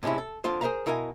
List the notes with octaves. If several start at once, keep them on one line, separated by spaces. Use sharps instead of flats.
A2 C3 G#3 C#4 E4
A4
F2 D3 F4 C5
G#4 A#4 C5 E5 F5 A#5
B2 E4 A#4 D#5 F5 G#5